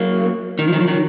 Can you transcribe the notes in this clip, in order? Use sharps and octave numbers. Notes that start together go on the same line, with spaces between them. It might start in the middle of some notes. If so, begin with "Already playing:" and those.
Already playing: F#3 A#3
D#3
F3
D#3 F#3
F3
D#3 F#3